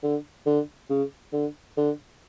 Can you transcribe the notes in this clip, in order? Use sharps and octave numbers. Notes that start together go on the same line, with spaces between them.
D3
D3
C#3
D3
D3